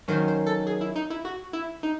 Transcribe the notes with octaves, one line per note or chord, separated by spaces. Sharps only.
D#3 F#3 C#4 C5
C5
A4
G#4
E4
D#4
E4
F#4
E4
D#4